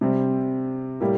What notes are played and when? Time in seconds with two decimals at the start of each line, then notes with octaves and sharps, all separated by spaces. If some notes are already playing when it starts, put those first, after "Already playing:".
0.01 C3 G3 C4
1.00 A2 G3 A#3 E4 G4